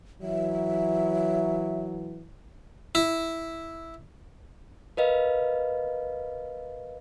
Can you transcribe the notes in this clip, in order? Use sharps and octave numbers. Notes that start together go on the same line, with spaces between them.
E3 F#3 E5
E4
A#4 B4 D#5 F5